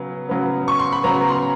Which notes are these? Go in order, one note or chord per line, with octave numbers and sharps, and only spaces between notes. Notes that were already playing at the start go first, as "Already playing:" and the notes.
Already playing: C#3 F#3 B3
C#3 F#3 B3
C#6
C6
B5
C#3 F#3 B3 A#5
C6